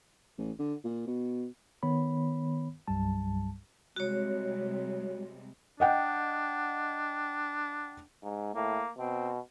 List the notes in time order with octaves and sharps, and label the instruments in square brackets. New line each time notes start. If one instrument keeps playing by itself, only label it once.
[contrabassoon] A1
D3
A#2
B2
[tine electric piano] D#3 B3 C#5 B5
C2 G2 F#3 G3 A5
[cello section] C3 G3 G#3 [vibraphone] F#4 C#5
[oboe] D4 [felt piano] D#5 F#5 G5
[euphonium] G#2
[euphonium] A2 [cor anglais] A#3
[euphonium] B2 [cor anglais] C4